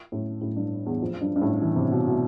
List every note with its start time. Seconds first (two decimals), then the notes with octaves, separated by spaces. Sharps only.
0.12 A2
0.41 A2
0.56 G2
0.86 E2
1.02 F2
1.21 G2
1.36 G2
1.42 A2
1.62 E3
1.76 C3
1.91 B2
2.07 B2